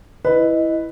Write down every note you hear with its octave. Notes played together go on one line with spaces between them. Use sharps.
E4 B4 D#5